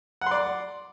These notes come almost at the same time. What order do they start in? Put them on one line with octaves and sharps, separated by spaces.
F#5 C6 D5